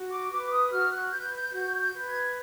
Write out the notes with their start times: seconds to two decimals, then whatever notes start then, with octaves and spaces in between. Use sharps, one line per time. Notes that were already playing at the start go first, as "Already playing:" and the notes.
Already playing: F#4
0.10 D6
0.31 B4 D6
0.51 D#6
0.71 F#4 F6
0.92 F#6
1.12 B4 G6
1.33 G6
1.52 F#4 G6
1.80 G6
1.93 B4
2.07 G#6